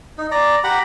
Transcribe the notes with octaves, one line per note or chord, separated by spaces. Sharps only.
D#4
D5 A#5
G4 F#5 A#5 B5